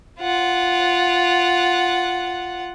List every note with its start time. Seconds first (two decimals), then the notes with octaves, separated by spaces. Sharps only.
0.20 F4 F#5